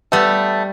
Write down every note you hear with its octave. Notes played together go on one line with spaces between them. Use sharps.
G3 A3 B3